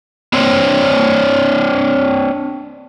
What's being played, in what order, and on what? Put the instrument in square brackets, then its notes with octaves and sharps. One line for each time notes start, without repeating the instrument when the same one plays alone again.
[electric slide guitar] C4 D4 C5 C#5